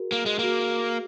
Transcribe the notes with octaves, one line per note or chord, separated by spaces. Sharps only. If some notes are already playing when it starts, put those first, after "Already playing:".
Already playing: F#4 G#4 A#4
A#3
G#3
G#4
A#3 F#4